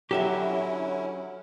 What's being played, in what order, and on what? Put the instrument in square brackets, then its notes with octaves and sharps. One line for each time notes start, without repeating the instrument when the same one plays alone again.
[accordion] D3 C#4 E4 [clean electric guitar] F#3 [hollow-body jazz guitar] G4 A4 E5